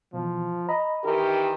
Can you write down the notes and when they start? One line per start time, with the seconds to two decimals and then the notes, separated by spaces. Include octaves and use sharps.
0.13 B2 E3 F3
0.69 D#5 A#5 B5
1.04 D#3 E3 G4 A#4